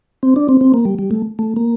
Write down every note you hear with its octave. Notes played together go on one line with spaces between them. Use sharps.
C4
D4
C4
C4
A#3
G3
G3
A3
A3
A#3